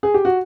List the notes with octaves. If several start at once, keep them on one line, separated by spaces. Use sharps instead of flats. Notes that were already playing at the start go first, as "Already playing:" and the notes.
G#4
G4
F#4